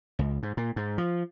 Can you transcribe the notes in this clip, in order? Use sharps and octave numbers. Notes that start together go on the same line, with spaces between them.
C#2
G#2
A#2
G#2
F3